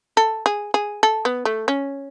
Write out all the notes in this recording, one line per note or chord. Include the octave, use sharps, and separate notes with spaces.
A4
G#4
G#4
A4
B3
A3
C#4